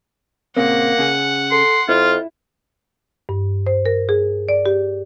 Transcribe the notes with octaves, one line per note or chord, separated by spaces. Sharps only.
A#2 C#3 A#3 C4 F#5
C#3 G#4
A4 C6
F2 E4 F4
G2
C5
A#4
G#4
D5
G4